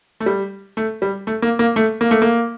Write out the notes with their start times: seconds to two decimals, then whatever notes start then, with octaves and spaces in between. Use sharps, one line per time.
0.20 A3
0.26 G3
0.77 A3
1.02 G3
1.27 A3
1.42 A#3
1.59 A#3
1.76 A3
2.01 A#3
2.11 A3
2.22 A#3